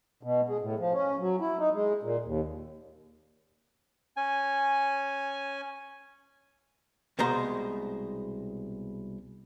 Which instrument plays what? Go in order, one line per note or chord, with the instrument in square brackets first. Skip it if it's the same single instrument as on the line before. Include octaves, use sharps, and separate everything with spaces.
[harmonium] B2
G#3
A2
F3
C#4
F#3
E4
D#4
G#3
A#2
D#2
[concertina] C#4 G#5
[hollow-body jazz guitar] C2 B2 G#3 C5 A#5